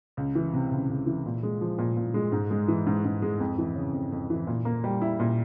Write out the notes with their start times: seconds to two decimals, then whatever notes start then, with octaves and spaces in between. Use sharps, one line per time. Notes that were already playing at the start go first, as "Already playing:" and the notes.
0.17 C#2
0.35 E3
0.53 C3
0.72 C#2
0.89 C#2
1.07 E3
1.26 A#2
1.43 G#3
1.61 F3
1.78 A#2
1.97 A#2
2.14 G#3
2.32 G#2
2.51 G#3
2.68 E3
2.87 G#2
3.05 G#2
3.22 G#3
3.40 F2
3.58 E3
3.75 C#3
3.93 F2
4.12 F2
4.30 E3
4.47 A#2
4.65 A#3
4.84 G3
5.01 E4
5.19 A#2